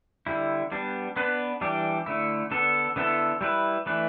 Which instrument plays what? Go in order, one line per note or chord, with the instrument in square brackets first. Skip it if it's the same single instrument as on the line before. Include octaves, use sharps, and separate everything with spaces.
[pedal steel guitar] D3 G3 E4
G3 B3 D4
B3 D4 B4
E3 G3 D4 G4
D3 A3 E4
D3 B3 D4 A4
D3 B3 E4 A4
G3 E4 B4
E3 A3 D4 B4